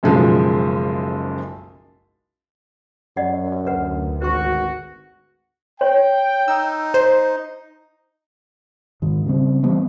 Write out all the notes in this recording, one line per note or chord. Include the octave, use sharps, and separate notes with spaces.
F#1 B1 F#2 F3 G#3
F#2 D5 D#5 F#5
D2 B4 F#5
G#1 F#4 B4 C#6
C#5 G5
D#4 E6
C5
G#2 D#3
C#3 G3 A3 C4
E3 G3 B3 C4